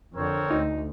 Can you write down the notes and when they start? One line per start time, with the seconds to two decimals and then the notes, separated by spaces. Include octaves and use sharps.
0.15 F2 D3 C4 A#4 C#5
0.50 D2 D#4